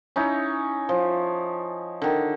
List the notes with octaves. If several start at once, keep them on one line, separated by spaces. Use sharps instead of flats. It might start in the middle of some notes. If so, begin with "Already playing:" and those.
C#4 D#4 E4
F3
D3 D#3